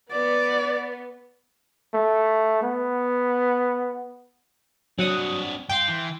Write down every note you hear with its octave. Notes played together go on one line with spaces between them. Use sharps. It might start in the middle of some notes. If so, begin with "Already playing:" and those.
B3 D5
A3
B3
F#3 C4 D4 F#5 D#6
G2 F5 G5 C6
E3